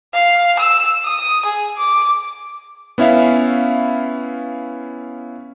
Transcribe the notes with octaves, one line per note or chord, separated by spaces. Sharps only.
F5
E6
D#6
G#4
D6
B3 C#4 E4 E5 F5